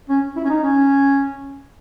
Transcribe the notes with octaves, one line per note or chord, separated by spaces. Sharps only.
C#4
E4
C#4
D#4
C#4